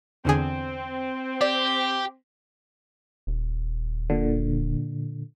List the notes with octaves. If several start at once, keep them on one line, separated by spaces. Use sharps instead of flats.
E2 D3 C4 G#4
G4 D5
D#1
A#2 D3